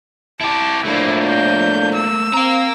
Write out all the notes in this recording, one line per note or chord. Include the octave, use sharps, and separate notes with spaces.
E4 G4 A5
A2 F3 A3 A#3 D4 E4
G6
E6
C4 F5 A#5